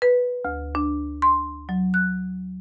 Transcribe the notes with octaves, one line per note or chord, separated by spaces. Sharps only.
B4
D2
D4
C6
F#3
F#6